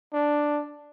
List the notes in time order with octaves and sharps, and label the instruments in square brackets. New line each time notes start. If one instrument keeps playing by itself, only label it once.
[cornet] D4